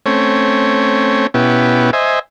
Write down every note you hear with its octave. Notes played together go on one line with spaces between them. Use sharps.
A3 C4 C#4 C#5
B2 B3 C#4 E4 G4
C5 D#5 E5 G#5